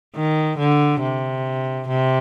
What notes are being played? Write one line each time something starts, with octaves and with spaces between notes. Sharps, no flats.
D#3
D3
C3
C3